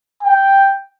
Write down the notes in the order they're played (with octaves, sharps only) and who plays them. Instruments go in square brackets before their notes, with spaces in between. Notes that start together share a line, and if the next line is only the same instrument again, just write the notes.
[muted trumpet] G5